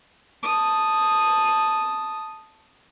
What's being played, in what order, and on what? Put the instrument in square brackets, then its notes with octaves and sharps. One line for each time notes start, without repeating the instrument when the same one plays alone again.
[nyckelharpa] A5 D#6